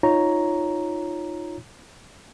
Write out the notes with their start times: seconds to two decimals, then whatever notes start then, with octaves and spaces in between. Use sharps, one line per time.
0.03 D#4 F4 C#5 A#5